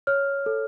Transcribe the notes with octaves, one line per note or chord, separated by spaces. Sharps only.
C#5 F6
A4